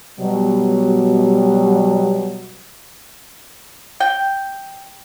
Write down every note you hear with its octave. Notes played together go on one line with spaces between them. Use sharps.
B2 F#3 G3
G5